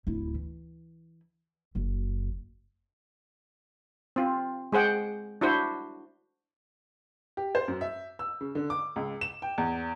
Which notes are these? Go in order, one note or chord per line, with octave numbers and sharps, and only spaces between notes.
D1 E4
E3
F#1 F#2
C4 F4
G#3 G#4 C5 F#5 G5
D4 E4 F#4 C5
G4
C5
F#2
E5
E6
C#3
D3
D6
C#2
E7
G5
E2